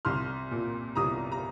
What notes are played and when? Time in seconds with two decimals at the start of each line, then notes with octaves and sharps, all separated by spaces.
0.05 C2 C6 F6
0.51 A#2
0.95 C2 A#5 D#6
1.32 A#5